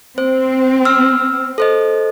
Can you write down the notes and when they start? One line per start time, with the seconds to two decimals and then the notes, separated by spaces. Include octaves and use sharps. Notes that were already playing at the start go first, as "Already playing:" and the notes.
0.18 C4 C5
0.85 E6 F6
1.58 A4 C5 D#5